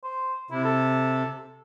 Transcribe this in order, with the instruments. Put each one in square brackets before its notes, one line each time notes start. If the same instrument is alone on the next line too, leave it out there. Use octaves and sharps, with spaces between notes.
[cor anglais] C5
[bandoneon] C3 [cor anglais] E4
[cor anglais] A4